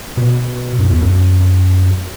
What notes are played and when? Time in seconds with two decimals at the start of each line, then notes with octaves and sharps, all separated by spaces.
0.17 B2
0.78 F#2
0.90 E2
1.01 F#2